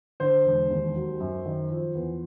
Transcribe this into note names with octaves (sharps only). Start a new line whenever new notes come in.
D3 C5
E1
D#2
F#3
F#2
D#3
F3
E2